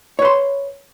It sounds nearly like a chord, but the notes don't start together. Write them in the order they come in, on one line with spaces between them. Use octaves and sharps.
C#5 B4 C6